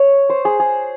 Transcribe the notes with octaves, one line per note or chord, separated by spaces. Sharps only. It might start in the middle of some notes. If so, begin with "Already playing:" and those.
Already playing: C#5
C5
G#4
G#4